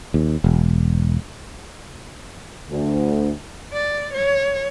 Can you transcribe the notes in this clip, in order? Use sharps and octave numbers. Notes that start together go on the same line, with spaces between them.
D#2
E1
D2
D5
C#5